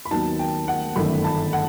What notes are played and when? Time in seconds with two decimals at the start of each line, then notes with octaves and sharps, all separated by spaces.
0.05 B5
0.11 D#2 D#3 F#3 B3 D#4 A5
0.39 G5
0.68 F#5
0.96 G1 F#2 D#3 A3 B5
1.24 A5
1.53 F#5